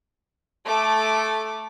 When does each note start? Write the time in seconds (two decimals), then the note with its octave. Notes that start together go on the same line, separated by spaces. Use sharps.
0.65 A3 D6